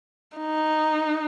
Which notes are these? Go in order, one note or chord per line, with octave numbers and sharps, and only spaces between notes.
D#4